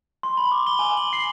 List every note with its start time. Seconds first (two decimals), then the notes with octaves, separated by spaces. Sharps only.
0.23 C6
0.37 B5
0.52 D6
0.67 G7
0.79 G#5
0.97 F#7
1.13 C7